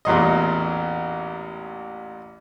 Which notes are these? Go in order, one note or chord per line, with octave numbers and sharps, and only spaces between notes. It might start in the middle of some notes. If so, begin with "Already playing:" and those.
A1 E2 A#2 D#5